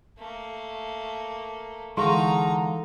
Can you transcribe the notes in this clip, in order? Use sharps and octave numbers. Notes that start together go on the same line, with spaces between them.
A3 A#3
D3 E3 G#3 D#4 F5 A#5 C6 C#6